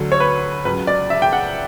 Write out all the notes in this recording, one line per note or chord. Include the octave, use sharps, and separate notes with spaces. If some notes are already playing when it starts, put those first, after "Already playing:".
Already playing: D2 D3 F#3 A4
C#5
B4
C#2 C#3 F#3 B4
D5
E5
G5
F#5